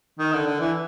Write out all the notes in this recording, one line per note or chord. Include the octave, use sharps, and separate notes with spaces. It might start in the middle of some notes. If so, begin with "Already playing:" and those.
D#3
D3
D3
E3